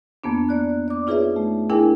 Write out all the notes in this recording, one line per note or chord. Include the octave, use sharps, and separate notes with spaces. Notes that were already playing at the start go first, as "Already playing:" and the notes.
F2 A#3 B3 D4
A#3 D5 F#6
D5 D6
D#4 F4 G#4 B4 C#5 E5
A3
D4 E4 G#4 A#4 G5 G#5